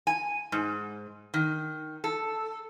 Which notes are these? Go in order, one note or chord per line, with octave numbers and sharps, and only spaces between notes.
G#5
G#2
D#3
A4